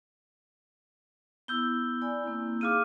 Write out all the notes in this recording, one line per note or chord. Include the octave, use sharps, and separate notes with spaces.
B3 E4 E6 G6 G7
D5 G#5 B5
A#3 C4 E4
D#4 G#4 F5 D6 F6 D#7